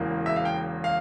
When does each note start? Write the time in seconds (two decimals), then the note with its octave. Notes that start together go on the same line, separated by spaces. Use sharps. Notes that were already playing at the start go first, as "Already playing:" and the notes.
Already playing: E1 E2 C#3 E3 A#3
0.26 E5
0.36 F5
0.45 G5
0.84 F5